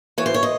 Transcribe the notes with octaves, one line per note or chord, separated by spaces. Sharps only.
E3 C#5
C5
C#5
D#5